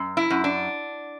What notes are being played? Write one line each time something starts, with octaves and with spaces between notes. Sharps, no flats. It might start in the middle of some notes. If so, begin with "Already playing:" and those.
Already playing: F#2
E4
F#2
D4